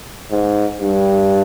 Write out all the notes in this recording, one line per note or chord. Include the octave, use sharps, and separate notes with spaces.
G#2
G2